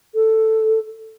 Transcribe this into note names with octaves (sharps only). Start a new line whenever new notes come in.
A4